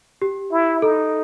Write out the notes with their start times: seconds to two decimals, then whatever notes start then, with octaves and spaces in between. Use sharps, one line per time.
0.22 G4
0.52 E4
0.82 D#4 A4